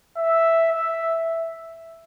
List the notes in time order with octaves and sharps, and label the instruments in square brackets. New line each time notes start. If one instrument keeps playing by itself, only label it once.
[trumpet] E5
E5